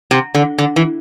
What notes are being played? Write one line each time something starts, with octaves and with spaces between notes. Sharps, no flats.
C3
D3
D3
E3